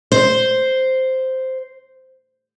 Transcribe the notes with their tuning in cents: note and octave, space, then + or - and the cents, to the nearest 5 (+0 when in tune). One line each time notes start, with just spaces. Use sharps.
C5 -5